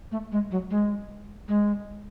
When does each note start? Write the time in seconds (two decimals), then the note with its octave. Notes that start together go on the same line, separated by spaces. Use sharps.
0.12 A3
0.32 G#3
0.51 F#3
0.70 G#3
1.48 G#3